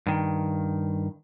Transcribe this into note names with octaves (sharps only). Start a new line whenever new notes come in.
G2 D#3